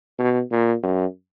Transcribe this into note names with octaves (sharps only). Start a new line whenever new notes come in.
B2
A#2
F#2